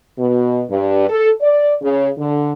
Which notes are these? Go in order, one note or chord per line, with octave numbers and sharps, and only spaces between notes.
B2
G2
A4
D5
C#3
D3